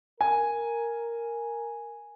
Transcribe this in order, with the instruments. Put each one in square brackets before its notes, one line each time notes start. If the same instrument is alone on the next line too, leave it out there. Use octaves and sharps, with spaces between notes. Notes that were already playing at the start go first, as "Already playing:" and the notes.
[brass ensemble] A#4 [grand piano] G#5